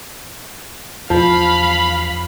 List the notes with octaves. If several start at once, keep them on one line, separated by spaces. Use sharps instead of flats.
E2 F3 F5 B5